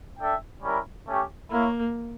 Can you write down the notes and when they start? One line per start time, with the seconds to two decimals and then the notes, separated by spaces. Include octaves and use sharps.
0.18 D4 A4 E5 G5
0.62 G3 C#4 E4 A#4
1.07 A3 C#4 G4
1.51 A#3 E4 A#4 C#5 F5